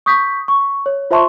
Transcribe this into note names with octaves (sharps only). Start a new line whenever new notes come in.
C#6 D#6 G6 B6
C#6
C#5
F4 C5 E5 A5 C6 C#6